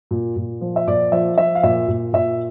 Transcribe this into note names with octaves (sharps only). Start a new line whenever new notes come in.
A#2
A#2
F3
E5
A#2 D5
F3 E5
F3 E5
F5
A#2 E5
A#2
A#2 E5